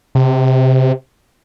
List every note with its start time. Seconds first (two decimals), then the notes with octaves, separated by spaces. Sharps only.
0.15 C3